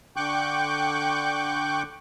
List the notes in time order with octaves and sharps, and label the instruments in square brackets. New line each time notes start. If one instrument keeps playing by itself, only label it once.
[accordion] D3 G5 C#6 D6 F#6 G6